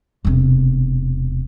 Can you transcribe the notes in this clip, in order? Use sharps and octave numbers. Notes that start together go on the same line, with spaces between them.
E1 C3